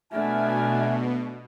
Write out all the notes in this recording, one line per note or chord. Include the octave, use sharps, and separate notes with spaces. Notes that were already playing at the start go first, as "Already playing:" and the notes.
B2 A3 B3 D4 E5 F#5 G#5 F6